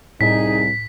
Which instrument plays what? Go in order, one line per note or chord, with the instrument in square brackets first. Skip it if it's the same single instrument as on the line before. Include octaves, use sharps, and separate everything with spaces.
[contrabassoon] C2 [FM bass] A2 [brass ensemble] D#4 G#4 [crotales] B6